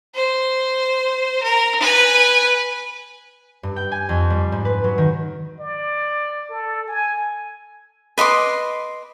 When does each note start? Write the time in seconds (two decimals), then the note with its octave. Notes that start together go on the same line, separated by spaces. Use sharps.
0.15 C5
1.43 A#4
1.80 B4 G#5
3.63 G2
3.76 G5
3.92 G#5
4.09 F2
4.30 G3
4.52 G#2
4.65 B4
4.84 F#3
4.98 D#3
5.60 D5
6.50 A4
6.88 G#5
8.18 B4 D#5 C6 D6